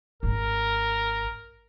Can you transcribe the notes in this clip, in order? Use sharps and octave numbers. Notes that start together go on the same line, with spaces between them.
G#1 A#4